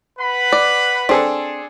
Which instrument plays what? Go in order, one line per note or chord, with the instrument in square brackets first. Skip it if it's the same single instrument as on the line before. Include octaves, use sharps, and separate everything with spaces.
[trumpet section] B4 F#5 B5
[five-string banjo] D5
[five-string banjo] C4 [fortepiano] D4 G#4 A4